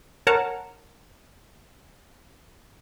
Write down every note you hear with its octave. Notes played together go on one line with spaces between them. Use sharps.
A#4 C#5 F#5 A5 A#5